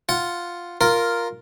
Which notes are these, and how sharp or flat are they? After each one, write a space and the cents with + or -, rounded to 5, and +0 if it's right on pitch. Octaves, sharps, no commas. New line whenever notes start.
F4 +0 F#5 +0
F4 +0 A#4 +0